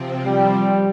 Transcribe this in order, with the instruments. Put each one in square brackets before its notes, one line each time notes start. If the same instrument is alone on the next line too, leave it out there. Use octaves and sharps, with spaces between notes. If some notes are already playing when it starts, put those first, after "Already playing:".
Already playing: [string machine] C3 F3 C4
[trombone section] G3